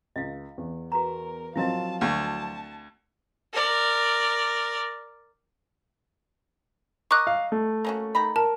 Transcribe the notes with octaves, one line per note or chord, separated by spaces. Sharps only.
C#2 D#5 F5
E2
F#4 A#4 B4 A#5
F3 F#3 C4 E4 A#4 D#5 F5 A5
D2 F5 A5 C#6
A#4 D5
A#4 D#5 C#6 D6 F#6
F5
A3
A#3 C#4 F#4
D#3 A#5 B5
A#4 A5